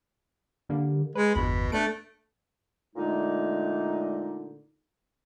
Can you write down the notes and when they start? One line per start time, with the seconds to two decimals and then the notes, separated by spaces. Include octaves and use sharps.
0.69 D3 G3 A#3
1.15 G#3 B4
1.35 G1 E2 B2 B5
1.72 A3 D4 F#6 D7
2.96 A#2 D3 G#3 A3 D#4